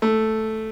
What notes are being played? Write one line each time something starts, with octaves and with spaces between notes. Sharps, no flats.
A3